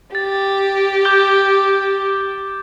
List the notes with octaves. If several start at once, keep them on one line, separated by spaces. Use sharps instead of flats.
G4 A6
D6 G6 G7